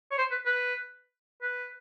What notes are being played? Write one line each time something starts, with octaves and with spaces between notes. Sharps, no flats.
C#5
C5
B4
B4
B4